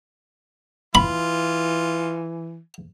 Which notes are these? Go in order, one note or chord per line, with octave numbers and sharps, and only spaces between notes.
E3 F4 B5